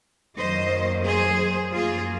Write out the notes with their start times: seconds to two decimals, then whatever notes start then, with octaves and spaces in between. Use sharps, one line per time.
0.37 F#2 D#3 F#3 A#3 C5 D#5
1.06 G#4 C5
1.73 F#2 F3 A#3 F4 G#4